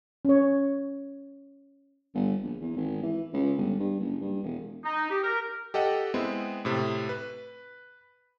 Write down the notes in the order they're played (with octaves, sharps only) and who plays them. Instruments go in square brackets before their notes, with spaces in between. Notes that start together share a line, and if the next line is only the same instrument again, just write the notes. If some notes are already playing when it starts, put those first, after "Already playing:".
[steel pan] C#4 C#5
[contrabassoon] G1
A#1
E2
G#1
E3
C#2
G1
G2
F#1
G2
E1
[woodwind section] D#4
G4
A#4
[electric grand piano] G4 A4 D#5 F#5
G#3 B3 C4 E4
A2 C3
B4